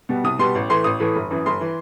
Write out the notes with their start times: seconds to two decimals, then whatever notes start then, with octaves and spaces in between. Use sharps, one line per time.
0.09 B2 G3 B3
0.24 C2 D#6
0.39 B2 G3 B3 C6
0.55 A1
0.70 A2 E3 A3 C6
0.84 A1 D#6
1.00 A2 E3 A3
1.16 G1
1.30 F#2 E3
1.46 G1 C6
1.61 E3